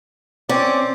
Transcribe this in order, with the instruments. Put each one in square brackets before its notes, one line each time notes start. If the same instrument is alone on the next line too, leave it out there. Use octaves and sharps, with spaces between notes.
[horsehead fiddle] C4 [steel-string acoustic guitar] C#4 [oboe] D5